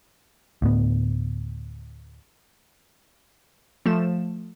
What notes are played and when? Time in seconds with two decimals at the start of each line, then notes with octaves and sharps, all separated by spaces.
0.62 D2 A2 B3
3.86 F3 A3 E7